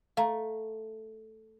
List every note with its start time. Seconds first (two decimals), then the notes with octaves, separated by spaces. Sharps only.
0.17 A3 F5 A#5